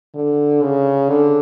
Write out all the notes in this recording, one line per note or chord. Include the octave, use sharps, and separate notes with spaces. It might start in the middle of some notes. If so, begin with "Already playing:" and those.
D3
C#3
D3